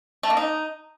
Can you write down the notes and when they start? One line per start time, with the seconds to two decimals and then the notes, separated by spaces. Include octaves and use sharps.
0.23 A3
0.30 A#3
0.37 D#4